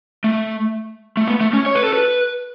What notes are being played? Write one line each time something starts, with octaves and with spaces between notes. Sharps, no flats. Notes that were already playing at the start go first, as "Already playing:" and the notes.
A3
A3
B3
A3
C#4
C#5
B4
A4
B4